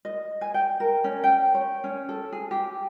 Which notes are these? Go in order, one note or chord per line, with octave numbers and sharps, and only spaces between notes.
D#5
G#5
G5
A#4
C#4
G5
C#5
C#4
A4
G#4
G4